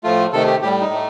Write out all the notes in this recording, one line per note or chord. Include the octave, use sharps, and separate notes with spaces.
A2 F3 A3 F4
C3 D#3 A3 A4
G4
A2 G3 G4
D#4
A2 A3